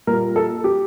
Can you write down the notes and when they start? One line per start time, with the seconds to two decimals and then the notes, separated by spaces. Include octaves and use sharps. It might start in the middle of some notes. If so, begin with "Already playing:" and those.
0.07 A#2 G3 A#3 A#4
0.36 A4
0.64 G4